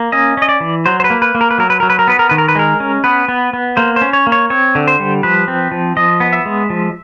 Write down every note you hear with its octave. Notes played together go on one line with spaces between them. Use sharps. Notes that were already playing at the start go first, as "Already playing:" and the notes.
Already playing: A#3
C#4 D#5
C#4 D#5
D5
E3
F#3 C5
C5
B4
A#3
B4
A#3
A#4
B4
F#3 A#4
B4
F#3 A#4
B4
A#4
B3 B4
A#4
D#3 B4
A#4
B4
G#3 A#4
C#4
B3 B4
B3
B3
A#3 C5
C5
C#4
C#5
A#3
C#5
C4 C#5
D3
C5
G3
F3 B4
C4
F3
F3 D#5
B3
E5
G#3
F3